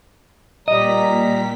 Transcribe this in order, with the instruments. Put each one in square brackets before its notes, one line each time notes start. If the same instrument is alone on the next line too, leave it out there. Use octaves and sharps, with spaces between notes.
[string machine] A#2 B6 [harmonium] G3 A#5 [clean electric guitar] D#5